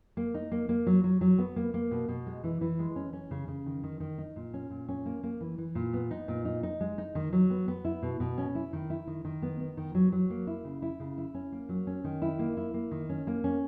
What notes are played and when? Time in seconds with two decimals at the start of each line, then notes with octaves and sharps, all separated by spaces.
0.17 A#3
0.34 D#4
0.52 A#3
0.69 A#3
0.86 F#3
1.04 F#3
1.21 F#3
1.38 B3
1.56 A#3
1.74 A#3
1.91 B2
2.09 B2
2.27 G#3
2.44 E3
2.61 E3
2.79 G#3
2.96 C#4
3.13 C#4
3.31 C#3
3.48 C#3
3.66 D#3
3.83 D#3
4.00 D#3
4.18 D#4
4.36 A#2
4.54 C#4
4.70 A#2
4.89 C#4
5.06 A#3
5.23 A#3
5.41 E3
5.58 E3
5.75 A#2
5.93 B3
6.11 D#4
6.28 A#2
6.45 D#4
6.63 D#4
6.81 G#3
6.98 D#4
7.15 D#3
7.33 F#3
7.50 B3
7.68 B3
7.85 E4
8.03 B2
8.20 B2
8.38 C#4
8.55 E4
8.73 D#3
8.90 E4
9.07 D#3
9.25 D#3
9.42 B3
9.60 B3
9.77 D#3
9.95 F#3
10.12 F#3
10.30 A#3
10.47 E4
10.65 C#3
10.82 E4
11.00 C#3
11.18 E4
11.34 C#4
11.52 A#3
11.69 F#3
11.87 C#4
12.04 D#3
12.22 E4
12.39 A#3
12.57 E4
12.74 A#3
12.91 D#3
13.09 C#4
13.27 A#3
13.44 C#4